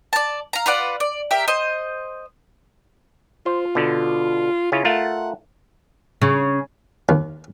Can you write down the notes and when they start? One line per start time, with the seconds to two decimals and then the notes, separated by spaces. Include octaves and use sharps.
0.13 D5 A5
0.53 F5 A#5
0.66 F4 B4 D5 F#5
1.00 D5
1.31 G4 A#4 E5
1.48 C5 D#5
3.46 F4 C5
3.75 B2 D3
4.72 C#3 C#4 E4 F4
4.84 A3 F4 A#4 F#5
6.22 C#3
7.09 D#2